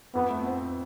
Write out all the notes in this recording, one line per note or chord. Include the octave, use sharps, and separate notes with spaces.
F2 B3
A3
C4